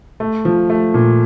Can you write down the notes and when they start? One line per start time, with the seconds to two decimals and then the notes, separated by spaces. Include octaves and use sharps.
0.20 A3
0.45 F3
0.70 A3
0.94 A#2